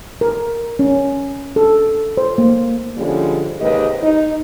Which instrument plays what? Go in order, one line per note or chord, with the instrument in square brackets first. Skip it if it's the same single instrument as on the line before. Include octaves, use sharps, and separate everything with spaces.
[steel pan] A#4
C#4
A4
C5
A#3
[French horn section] D3 F3 G3 G#3 C#4
D#2 G#2 C3 G4 B4 D#5
D#4